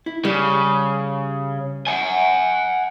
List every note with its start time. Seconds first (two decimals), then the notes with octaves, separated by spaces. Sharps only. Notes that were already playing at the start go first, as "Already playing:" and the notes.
0.06 E4
0.25 C#3 G3
1.87 F#5 G#5